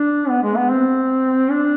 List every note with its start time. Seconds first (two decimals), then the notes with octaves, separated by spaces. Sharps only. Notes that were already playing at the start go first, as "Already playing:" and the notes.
Already playing: D4
0.29 B3
0.43 G#3
0.57 B3
0.70 C4
1.51 D4